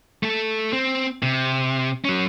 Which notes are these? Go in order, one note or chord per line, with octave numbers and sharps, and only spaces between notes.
A3 A4
C4
C3
F#3 C#4